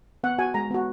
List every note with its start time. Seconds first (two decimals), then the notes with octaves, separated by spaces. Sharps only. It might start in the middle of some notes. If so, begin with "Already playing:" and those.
0.24 B3 F#5
0.38 F#4 G#5
0.54 G#3 A#5
0.71 B3 F#4